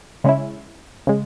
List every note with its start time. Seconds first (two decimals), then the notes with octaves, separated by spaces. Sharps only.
0.24 C#3 G#3 C#4 E4
1.07 C#3 G#3